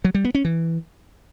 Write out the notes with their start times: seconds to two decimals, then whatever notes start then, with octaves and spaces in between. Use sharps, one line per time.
0.05 F#3
0.15 G3
0.25 B3
0.35 C#4
0.45 E3